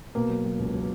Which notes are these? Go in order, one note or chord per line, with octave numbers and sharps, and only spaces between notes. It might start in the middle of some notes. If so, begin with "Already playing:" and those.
B2 A#3
F#3
F#3
C#2
F#3